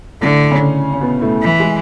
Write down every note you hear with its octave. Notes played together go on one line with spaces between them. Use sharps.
A2 D3 A3
C#3 C#4
C#4
B2 B3
A2 A3
E3
G#3